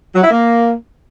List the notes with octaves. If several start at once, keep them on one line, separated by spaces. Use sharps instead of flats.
F#3
E4
A#3